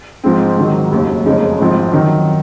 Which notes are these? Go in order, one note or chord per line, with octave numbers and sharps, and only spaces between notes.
G#2 F3 G#3 C4
G#2 D#3 F#3
F1 D#2 C#3 F#3
F#1 F2 C#3 G#3 D#4
G#1 G#2 F3 C4
F#2 D#3 F#3